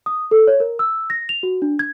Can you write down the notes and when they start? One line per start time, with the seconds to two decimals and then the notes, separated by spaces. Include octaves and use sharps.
0.06 D#6
0.31 A4
0.47 C#5
0.60 A#4
0.79 E6
1.10 A#6
1.29 F7
1.43 F#4
1.62 D4
1.79 G#6